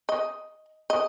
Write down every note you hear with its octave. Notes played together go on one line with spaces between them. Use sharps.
D#5
D#5